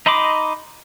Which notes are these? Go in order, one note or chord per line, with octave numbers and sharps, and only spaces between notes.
D#4 D#5 B5 C6 D6